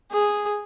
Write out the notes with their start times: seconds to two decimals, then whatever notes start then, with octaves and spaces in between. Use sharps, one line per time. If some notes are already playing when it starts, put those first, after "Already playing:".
0.11 G#4